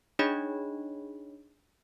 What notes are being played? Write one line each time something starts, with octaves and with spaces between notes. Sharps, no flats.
D4 D#4 G#4 C#5 D#5 B5